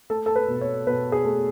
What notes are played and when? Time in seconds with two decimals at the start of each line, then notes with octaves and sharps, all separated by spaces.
0.10 A3 A4
0.26 A4
0.36 B4
0.48 B2
0.61 C#5
0.87 B2 B4
1.12 G#4
1.25 A3